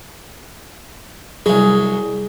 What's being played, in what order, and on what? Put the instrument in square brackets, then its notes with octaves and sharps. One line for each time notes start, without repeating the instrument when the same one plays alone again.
[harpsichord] C2 F#3 [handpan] G#4